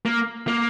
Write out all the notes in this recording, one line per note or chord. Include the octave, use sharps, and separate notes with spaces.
A#3
A#3